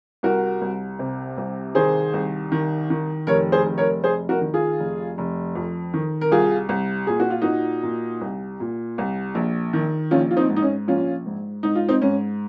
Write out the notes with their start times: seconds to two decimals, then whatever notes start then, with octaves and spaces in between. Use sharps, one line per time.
0.23 C2 F#4 A#4
0.61 C2
0.99 C3
1.37 C2
1.75 D#3 G#4 C5
2.13 C2
2.52 D#3
2.90 D#3
3.27 F1 A#4 C#5
3.52 G#4 C5
3.66 F1
3.78 A#4 C#5
4.03 F1 G#4 C5
4.29 F#4 A#4
4.41 D#3
4.54 F4 G#4
4.80 F1
5.18 F1
5.55 F2
5.94 D#3
6.21 A#4
6.31 C2 F4 G#4
6.69 C2
7.07 A#2 G#4
7.20 F#4
7.30 F4
7.42 A#2 D#4 F#4
7.83 A#2
8.21 C2
8.60 A#2
8.98 C2
9.35 A#1
9.73 D#3
10.11 A#1 C#4 F4
10.31 F4
10.37 C4 D#4
10.49 G#2
10.56 D#4
10.62 C#4
10.88 A#1 C#4 F4
11.26 G#2
11.63 G#2 D#4
11.75 F4
11.88 C4 D#4
12.02 G#2 C#4